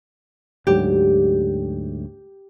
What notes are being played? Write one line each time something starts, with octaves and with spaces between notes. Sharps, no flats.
D2 G#2 F#3 G4